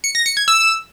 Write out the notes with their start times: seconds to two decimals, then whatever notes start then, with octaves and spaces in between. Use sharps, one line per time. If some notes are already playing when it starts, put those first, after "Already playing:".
0.04 C#7
0.15 A#6
0.26 C#7
0.37 G#6
0.48 E6